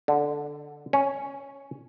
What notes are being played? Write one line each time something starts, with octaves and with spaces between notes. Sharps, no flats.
D3
C#4